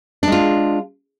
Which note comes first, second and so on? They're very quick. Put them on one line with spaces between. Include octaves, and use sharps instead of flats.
D4 G#3 F4